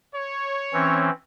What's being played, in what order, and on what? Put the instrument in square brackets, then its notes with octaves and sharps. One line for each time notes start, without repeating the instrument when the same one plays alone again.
[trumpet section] C#5
[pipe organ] E3 C4 C#4